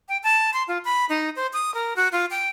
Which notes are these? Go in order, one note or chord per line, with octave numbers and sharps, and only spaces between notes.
G5
A5
C6
F4
B5
D#4
C5
D#6
A#4
F#4
F4
G5